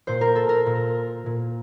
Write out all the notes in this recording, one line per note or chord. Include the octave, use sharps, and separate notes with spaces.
A#2 C5
A#4
A4
A#4
A#2
A#2